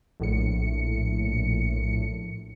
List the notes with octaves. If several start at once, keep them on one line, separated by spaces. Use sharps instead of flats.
A#1 A2 C#7